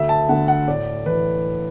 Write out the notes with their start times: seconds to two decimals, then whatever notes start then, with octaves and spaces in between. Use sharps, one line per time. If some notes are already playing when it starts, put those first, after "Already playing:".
Already playing: D2 E5
0.09 A5
0.29 D3 A3 F#5
0.48 F#5
0.68 A2 D5
1.06 E3 B4